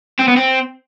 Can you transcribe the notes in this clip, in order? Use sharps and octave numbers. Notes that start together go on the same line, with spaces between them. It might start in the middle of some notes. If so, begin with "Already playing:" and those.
C4
B3
C4